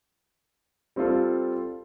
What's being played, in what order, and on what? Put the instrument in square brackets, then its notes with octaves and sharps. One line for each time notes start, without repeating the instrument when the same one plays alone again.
[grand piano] G3 C4 F4 A4